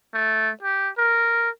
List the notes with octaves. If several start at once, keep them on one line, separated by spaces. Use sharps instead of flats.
A3
G4
A#4